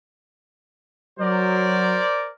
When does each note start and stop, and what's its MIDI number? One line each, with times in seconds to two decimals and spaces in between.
1.19 1.98 54
1.19 2.29 70
1.19 2.29 72
1.19 2.29 74